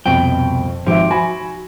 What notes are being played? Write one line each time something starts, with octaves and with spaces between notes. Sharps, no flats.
C2 F2 B2 G5
G#1 F3 G4 E5
F#4 G#5 B5